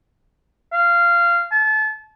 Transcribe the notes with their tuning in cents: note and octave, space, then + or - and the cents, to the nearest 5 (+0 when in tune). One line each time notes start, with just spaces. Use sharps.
F5 -15
A5 -30